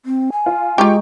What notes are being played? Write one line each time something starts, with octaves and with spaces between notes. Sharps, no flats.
C4
G#5
F4
G#3 F4 G4 G5 A#5 C#6